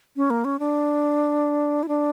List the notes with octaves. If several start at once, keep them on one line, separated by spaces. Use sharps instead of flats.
C#4
A#3
C#4
D4
E4
D4